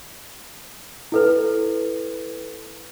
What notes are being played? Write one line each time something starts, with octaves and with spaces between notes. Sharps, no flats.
E4 A4 B4